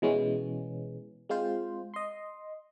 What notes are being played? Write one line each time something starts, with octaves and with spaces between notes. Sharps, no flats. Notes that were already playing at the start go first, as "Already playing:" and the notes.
B2 E3 G#3 B3 C#4
G#3 C4 F4 C5
D#5 C6